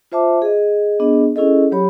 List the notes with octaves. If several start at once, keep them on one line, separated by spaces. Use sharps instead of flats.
F4 C5 E5 A5 D6
G#4 D#5
B3 D4 G#4 D#5
C#4 E4 G#4 A4 D#5
F#3 G4 C#5 B5